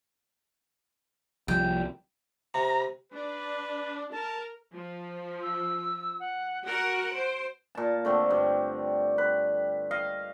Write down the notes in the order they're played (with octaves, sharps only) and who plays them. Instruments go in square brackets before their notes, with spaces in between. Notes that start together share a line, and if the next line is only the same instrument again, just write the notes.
[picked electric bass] C2 F3 G3 [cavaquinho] G5
[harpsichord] C3 [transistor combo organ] A#5
[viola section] D4 [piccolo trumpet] B4
[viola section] A#4 [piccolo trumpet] A5
[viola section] F3
[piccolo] E6
F#5
[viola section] F#4 A#4 F#5 [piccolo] D7
[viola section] C5
[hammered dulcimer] A#2 A5
D3 A3 C4
G2
B4
D#5 F5